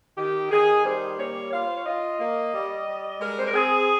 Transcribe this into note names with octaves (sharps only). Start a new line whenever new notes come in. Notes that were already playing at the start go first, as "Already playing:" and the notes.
D#3 G4
D#3 G#4
G3 C5
A#3 C#5
F4 F5
C5
C#5
F4 D#5
A#3
G3
G3
G#3 A#4
C5
A#4
C4 G#4